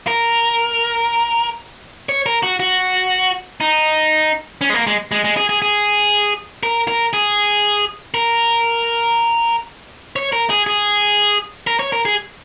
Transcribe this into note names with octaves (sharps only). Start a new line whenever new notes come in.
A#4
C#5
A#4
F#4
F#4
D#4
C#4
G#3
A#3
G#3
G#3
G#3
G#4
G#4
G#4
A#4
A#4
G#4
A#4
C#5
A#4
G#4
G#4
A#4
C#5
A#4
G#4